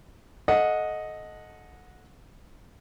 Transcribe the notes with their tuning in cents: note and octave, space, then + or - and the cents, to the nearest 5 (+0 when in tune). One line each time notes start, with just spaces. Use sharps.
A4 -10 D#5 +0 F#5 -20